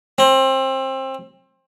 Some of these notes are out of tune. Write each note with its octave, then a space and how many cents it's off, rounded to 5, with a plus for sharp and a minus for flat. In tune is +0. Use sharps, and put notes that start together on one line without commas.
C4 +25